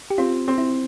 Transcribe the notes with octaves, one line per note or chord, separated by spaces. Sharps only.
G4
C4 F4
C4
E4